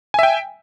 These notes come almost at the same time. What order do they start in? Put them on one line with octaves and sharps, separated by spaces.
G#5 E5 G5